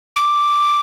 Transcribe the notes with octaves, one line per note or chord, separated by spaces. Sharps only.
D6